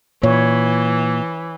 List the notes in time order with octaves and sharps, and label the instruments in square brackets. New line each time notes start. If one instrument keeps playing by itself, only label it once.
[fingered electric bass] A#2 [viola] E3 [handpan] C#5